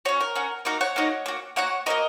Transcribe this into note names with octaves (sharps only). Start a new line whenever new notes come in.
C#4 F#4 C#5
A#4
C#4 F#4
A#3 D#4 F#4 A#4
C#5 F#5
A#3 D#4 F#4
A#3 F#4
A#3 F#4 C#5 F#5
A#3 C#4 F#4 A#4 D#5